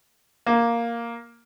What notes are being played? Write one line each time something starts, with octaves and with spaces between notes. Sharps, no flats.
A#3